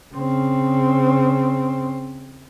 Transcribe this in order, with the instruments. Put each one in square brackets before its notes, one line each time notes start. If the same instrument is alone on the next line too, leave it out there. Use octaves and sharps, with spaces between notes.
[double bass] C#3 C4